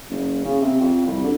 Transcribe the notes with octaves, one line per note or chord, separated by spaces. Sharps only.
F#1
C#3
C3
F2
C2
D3